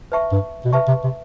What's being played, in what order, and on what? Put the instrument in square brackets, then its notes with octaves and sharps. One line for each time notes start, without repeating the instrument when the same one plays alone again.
[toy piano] B4 E5 A5 C#6
[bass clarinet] G2
B2
[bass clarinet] C3 [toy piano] B4 E5 A5 C#6
[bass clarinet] C3
C3